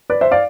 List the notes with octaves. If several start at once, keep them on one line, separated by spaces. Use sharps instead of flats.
B4 D5
C5 E5
D5 F5